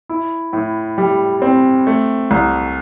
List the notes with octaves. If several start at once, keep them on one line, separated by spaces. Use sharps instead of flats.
E4
A2
G3
C4
A3
C2